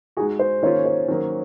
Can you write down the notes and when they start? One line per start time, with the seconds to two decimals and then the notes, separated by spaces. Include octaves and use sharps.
0.17 G#3 D#4 F#4 G#4
0.39 C5
0.63 D#3 A#3 C#4 F4 C#5
0.86 C5
1.08 D#3 F#3 A#3 C#4